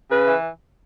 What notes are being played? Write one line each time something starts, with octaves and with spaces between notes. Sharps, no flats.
C#3 B4
E3